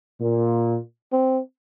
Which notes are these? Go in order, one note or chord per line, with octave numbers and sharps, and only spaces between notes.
A#2
C4